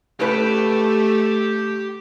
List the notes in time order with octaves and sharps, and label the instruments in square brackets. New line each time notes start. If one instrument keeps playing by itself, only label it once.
[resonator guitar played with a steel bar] A2 C#3 B4 [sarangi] A3 [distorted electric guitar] G4 G5